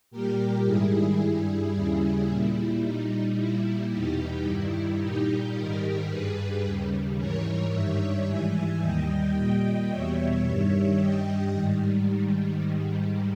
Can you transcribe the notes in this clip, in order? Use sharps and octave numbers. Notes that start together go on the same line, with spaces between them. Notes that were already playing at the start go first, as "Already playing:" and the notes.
A#2 G3 G4 A#4
G#2 D#3 G3 E4 G#4
G2 G3 E4 G#4
D#2 C#3 G3 E4 G#4
A#2 G3 E4
A#2 G3 D#4
A#2 G3 E4
E2 B2 G3 D#4 G4
G2 D#3 G3 E4
A#2 G3 D#4 G4
G#2 D#3 G3 G4 A#4
G2 G3 G#4 B4
D#2 C#3 G3
G#2 E3 G3 A#4 C#5
G2 D#3 G3 C#5 E5
G#2 E3 G3 E5 G#5
D#2 D#3 G3 D#5 G5
A#2 G3 D#5 G5
E2 B2 G3 C#5 E5
G2 D#3 G3 C#5 E5
G2 G3 D#5 G5
G#2 D#3 G3